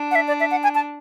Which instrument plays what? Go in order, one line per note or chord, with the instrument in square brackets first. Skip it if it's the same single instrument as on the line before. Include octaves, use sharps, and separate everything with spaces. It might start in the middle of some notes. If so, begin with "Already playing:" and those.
Already playing: [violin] D4
[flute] F#5
E5
D5
E5
F#5
G#5
A5